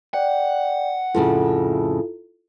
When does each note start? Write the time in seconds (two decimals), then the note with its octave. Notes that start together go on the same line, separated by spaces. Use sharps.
0.14 D5 F#5 G5
1.14 F2 A2 C#3 E4 F4 A4